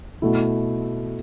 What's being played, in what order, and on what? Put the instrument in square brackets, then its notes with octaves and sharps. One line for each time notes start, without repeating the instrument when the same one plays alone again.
[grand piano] B2 A3 E4